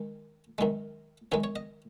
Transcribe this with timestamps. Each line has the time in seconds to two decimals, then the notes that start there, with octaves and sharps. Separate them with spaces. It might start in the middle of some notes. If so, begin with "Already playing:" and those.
Already playing: D#3 G#3
0.58 F#2 D#3 G#3
1.32 F#2 D#3 G#3 C#5
1.44 C#5
1.56 D#5